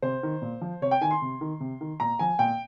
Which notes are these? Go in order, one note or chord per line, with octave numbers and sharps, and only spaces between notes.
C3 C5
D#3
A#2
F3
C3 C#5
G5
D#3 G#5
C6
C3
D#3
C3
D#3
A#2 A#5
F3 G#5
A#2 G5